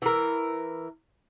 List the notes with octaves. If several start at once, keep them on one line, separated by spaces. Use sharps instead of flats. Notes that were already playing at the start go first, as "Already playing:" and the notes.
E3 A#4